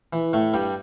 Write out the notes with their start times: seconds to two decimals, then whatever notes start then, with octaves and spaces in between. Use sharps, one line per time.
0.13 E3
0.33 A2 A3
0.54 G2 G3